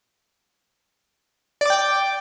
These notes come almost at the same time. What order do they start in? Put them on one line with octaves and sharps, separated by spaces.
D5 D6 G5